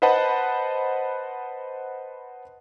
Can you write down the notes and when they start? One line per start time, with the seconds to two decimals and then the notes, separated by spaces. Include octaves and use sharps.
0.02 B4 C5 D#5 F#5 A5 B5